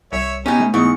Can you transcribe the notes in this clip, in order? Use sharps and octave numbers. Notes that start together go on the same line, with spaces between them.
C2 C#5 E5
B2 C#4 D#4 G4 G#5
A3
E2 G#2 E4 C#6